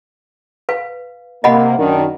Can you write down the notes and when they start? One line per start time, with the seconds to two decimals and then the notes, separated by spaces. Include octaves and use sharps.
0.69 B4 F5
1.44 C3 A#3 D#5 F#5 B5
1.78 F#2 D#3 D4